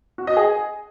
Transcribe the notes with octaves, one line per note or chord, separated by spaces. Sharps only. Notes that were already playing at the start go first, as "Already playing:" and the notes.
F#4
D#5
G#4